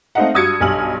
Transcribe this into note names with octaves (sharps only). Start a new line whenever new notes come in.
A3 C4 D#4 D#5 F5 F#5
G2 F#4 D#6 E6 G#6 C#7
B1 G2 G#5 F6 F#7